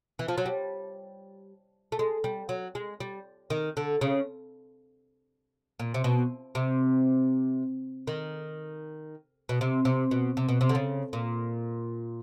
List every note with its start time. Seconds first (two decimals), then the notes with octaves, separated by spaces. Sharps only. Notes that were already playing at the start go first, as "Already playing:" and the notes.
0.19 E3
0.28 F3
0.38 F#3
0.46 G3
1.92 A3
1.99 G#3
2.24 G3
2.49 F#3
2.75 G#3
3.00 G3
3.50 D#3
3.77 D3
4.01 C#3
5.79 A#2
5.94 C3
6.04 B2
6.55 C3
8.07 D#3
9.49 B2
9.61 C3
9.85 C3
10.11 B2
10.37 C3
10.49 B2
10.61 C3
10.69 D3
10.75 C#3
11.13 A#2